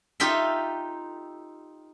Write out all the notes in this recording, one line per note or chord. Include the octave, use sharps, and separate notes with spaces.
D#4 F4 G4 A4 E5